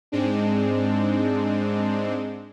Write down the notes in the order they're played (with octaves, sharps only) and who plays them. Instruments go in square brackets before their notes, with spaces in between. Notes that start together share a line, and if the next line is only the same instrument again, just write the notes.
[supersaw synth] G#2 G#3 C4 D4